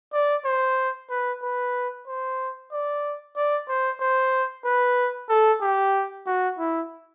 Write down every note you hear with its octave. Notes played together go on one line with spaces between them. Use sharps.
D5
C5
B4
B4
C5
D5
D5
C5
C5
B4
A4
G4
F#4
E4